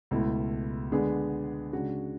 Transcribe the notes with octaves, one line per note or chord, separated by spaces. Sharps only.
C#2 B2 A3 E4
D3 G#3 B3 D4 G#4
C#3 G#3 D4 F#4